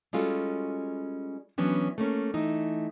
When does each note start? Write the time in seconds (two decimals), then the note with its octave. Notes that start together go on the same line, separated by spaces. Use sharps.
0.13 G3 G#3 C#4 F4 F#4 A4
1.58 E3 F#3 B3 C#4 D4
1.98 A3 A#3 C#4
2.34 E3 A3 D#4